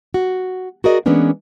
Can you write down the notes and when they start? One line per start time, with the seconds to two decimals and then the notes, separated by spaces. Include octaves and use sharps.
0.14 F#4
0.84 F#4 G#4 A#4 D5 D#5
1.06 E3 G#3 A#3 B3 C#4 D4